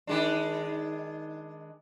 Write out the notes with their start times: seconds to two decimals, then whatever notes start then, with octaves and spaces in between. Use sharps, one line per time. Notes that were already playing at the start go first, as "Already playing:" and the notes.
0.07 D#3 G#3 D4